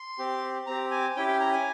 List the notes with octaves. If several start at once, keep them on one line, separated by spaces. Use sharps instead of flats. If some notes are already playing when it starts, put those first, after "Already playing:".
Already playing: C6
C4 G4
C4 G4 A#5
G#5
C#4 E4 G4 G5
G5
A#5
G#5